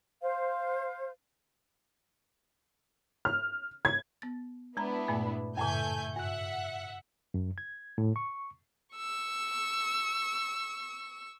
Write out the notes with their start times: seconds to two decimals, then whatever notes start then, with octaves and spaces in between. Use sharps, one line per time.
0.22 C5 F5
3.25 F6
3.85 G#6
4.22 B3 A6
4.77 G#3 B3 D4 E4 A5 A#5
5.08 G2 A#2 A3
5.57 F#2 A2 C#3 A3 G#5 G6
6.16 G2 E5 F#5 F#6
7.34 F#2
7.58 G#6
7.98 A2
8.16 C#6
8.96 C#6 E6